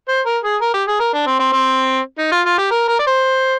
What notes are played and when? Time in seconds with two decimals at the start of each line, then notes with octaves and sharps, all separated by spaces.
0.08 C5
0.26 A#4
0.44 G#4
0.61 A#4
0.74 G4
0.87 G#4
1.00 A#4
1.13 D4
1.26 C4
1.39 C4
1.53 C4
2.18 D#4
2.32 F4
2.45 F4
2.58 G4
2.71 A#4
2.88 A#4
2.99 D5
3.07 C5